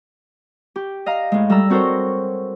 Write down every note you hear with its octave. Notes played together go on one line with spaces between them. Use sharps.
G4
D#5 F5 A#5
A2 G#3
G3 A4 A#5 E6
C4 F#4 A4 A#4 C5 C#5